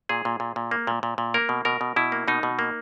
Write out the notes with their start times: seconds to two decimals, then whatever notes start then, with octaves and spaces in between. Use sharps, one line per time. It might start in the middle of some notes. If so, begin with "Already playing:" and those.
0.09 A#2 G#4
0.25 A#2
0.40 A#2
0.56 A#2
0.71 A#3
0.87 A#2
1.03 A#2
1.18 A#2
1.34 A#3 A#4
1.49 B2
1.65 B2 A#4
1.81 B2
1.96 B2 E4
2.12 A#3
2.28 B2 D#4
2.43 B2
2.59 A#3